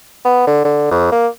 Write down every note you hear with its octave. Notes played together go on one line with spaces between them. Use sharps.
B3
D3
D3
F2
A#3